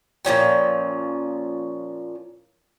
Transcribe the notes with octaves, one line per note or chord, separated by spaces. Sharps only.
A#2 F3 C#4 G5